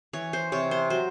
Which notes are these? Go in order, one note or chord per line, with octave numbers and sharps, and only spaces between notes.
E3 C#5
C5
C3 C#5
C5
F#3 C5